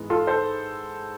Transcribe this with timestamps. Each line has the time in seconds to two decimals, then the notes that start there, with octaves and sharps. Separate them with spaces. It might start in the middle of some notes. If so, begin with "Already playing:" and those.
Already playing: G#2 E3 G#3 B3
0.10 F4 A4
0.27 A4 C5